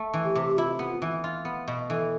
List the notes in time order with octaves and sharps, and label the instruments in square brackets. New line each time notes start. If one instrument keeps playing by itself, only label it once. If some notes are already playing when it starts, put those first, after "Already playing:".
Already playing: [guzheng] A3
E3
[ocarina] G4
[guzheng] C3
[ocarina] G4
[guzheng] E4 [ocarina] F4
[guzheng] B3
E3
F4
B3
B2
[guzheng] E3 [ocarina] A4